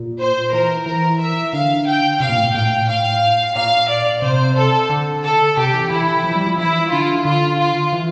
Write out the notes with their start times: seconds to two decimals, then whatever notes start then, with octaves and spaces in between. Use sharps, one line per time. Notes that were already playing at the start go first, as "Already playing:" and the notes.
Already playing: A#2
0.20 C5
0.52 E3 A#4
0.86 E3 A#4
1.20 E5
1.53 D3 F5
1.87 G5
2.20 C3 F5
2.29 A#2
2.38 A2
2.45 A#2
2.54 A2 G5
2.88 F5
3.55 A#2 F5
3.88 D5
4.22 C3 C5
4.56 A4
4.90 D3
5.23 A4
5.57 C3 G4
5.74 E3
5.90 E3 E4
6.07 E3
6.24 F3
6.35 G3
6.47 F3
6.58 E3 E4
6.91 D3 F4
7.25 D3 F4
7.59 F4
7.93 E3